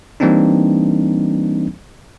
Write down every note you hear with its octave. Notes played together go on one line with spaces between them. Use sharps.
E3 G3 A#3 C4 D4 D#4